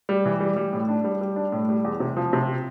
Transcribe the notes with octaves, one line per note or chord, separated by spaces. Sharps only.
G3
E3
G3
G3
A2
D4
G3
G3
D4
A2
G3
E2
C3
F3
C3